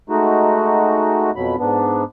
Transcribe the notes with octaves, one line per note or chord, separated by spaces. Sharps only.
G#3 A3 D#4 F#4
F2 B2 F#3 B5
G#2 B3 D4